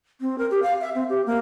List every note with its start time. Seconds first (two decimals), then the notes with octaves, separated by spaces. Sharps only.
0.21 C4
0.38 A#4
0.51 G4
0.62 F5
0.81 E5
0.95 C4
1.09 G4
1.26 A#3